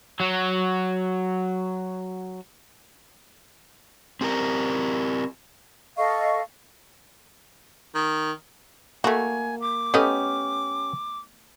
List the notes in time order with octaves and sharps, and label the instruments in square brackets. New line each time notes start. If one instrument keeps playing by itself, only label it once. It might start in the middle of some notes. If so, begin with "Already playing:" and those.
[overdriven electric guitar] F#3 F#4
[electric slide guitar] C4 G4 A#4
[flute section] A4 D#5 F5 C#6
[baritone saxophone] D#3
[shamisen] A3 F#4 [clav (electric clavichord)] A#3 [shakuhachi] G#5
[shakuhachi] D6
[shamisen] A3 B3 D#5 [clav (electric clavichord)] C#4 G4